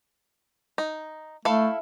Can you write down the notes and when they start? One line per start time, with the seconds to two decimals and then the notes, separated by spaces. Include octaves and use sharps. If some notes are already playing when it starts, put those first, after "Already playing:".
0.78 D#4
1.45 A3 E4 A4 F5